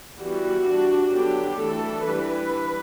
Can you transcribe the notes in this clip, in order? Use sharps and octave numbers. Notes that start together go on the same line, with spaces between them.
E3 G3 B3 F#4
G3 D4
D3 F#3 B3 D4 G4
E3 A3 D4 A4
E3 G3 D4 B4